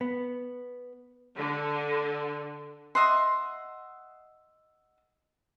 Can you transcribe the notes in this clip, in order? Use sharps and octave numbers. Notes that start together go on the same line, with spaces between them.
B3
D3
D#5 E5 F#5 C6